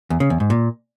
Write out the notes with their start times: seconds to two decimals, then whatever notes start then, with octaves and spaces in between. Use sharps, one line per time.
0.10 E2
0.20 C#3
0.30 E2
0.40 G#2
0.50 A#2